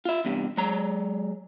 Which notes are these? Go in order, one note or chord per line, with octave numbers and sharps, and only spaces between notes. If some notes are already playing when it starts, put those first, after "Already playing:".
F4 E5
E2 G2 C3
F#3 G#3 A#5